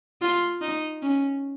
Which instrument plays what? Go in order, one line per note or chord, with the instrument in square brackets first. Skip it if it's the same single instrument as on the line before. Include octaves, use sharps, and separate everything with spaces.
[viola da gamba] F4
D#4
C#4